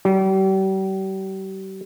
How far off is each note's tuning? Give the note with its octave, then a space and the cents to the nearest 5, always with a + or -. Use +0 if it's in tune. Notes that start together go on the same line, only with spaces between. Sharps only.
G3 -40